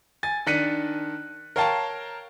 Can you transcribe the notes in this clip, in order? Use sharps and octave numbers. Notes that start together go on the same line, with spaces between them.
G#5 A6
D#3 D4 F#6 B6 C#7 D#7
A#4 C#5 F5 G5 A5